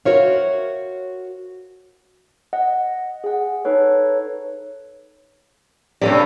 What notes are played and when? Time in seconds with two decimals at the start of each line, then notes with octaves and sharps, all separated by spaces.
0.05 F#4 A#4 C5 C#5 E5 F5
2.53 D#5 F#5
3.24 G#4 F#5
3.65 D#4 A4 B4 C#5
6.01 G2 C3 C#4 A4 D5